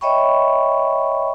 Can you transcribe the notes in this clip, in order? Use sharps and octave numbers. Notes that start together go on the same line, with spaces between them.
C#5 D#5 E5 G5 B5 C#6